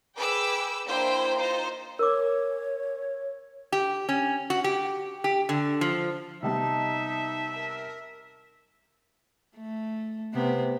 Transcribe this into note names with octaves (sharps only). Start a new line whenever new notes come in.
G#4 B4 G5 D6 E6
A#3 D4 E4 C5 G5
D#4 F4 C5
A#4 C#5 D6
G4
C#4
F#4
G4
G4
D3
F3
C3 G3 B3 D#4 E5 A5
A#4
A3
C3 B3